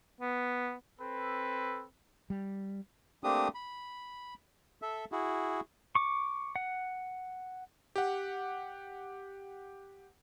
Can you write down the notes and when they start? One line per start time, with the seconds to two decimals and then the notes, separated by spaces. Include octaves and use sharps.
0.21 B3
1.00 C4 A4 B4
2.30 G3
3.24 A3 A#3 C4 D4 G4 D#6
3.55 B5
4.82 A4 E5
5.12 E4 F#4 G#4
5.95 C#6 D6
6.56 F#5
7.96 G4 F#5